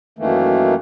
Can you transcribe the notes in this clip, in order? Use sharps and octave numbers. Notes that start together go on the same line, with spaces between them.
F#2 D#3 E3 A3 A#3